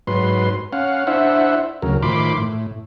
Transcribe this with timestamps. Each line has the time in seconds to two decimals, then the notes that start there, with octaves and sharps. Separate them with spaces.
0.07 G#2 F#3 B4 C6
0.73 C#4 F5 F#5
1.07 D4 E4 C5 E5 F#5
1.82 D2 C#3 F#3 A#4
2.03 A2 D#3 F3 B5 C6 D6
2.37 A2